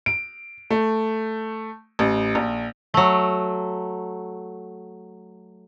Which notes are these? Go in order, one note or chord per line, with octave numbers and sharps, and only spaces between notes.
D7
A3
A1
A#1
F#3 A3